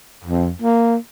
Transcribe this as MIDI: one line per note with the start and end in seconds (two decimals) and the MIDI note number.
0.25 0.51 41
0.62 0.95 58